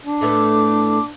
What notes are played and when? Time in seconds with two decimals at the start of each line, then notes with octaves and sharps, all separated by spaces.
0.04 D4
0.21 A2 A3 B3 D6